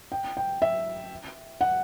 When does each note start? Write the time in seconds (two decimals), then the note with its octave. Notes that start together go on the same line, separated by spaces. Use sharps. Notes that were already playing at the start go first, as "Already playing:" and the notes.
0.12 G5
0.37 G5
0.62 E5
1.61 F#5